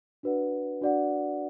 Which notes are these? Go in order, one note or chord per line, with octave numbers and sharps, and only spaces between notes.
D4 F#4 B4 D5 F#5
D4 F#4 B4 D5 F#5